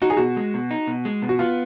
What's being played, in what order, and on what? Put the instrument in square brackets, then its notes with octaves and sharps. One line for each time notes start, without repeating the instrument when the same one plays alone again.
[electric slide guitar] D#4 [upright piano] F#4
[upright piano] G#4
[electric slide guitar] B2 [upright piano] F#4
[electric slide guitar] G#3
B2
D#4
B2
G#3
B2
[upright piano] F#4
[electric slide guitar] B3 [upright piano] F4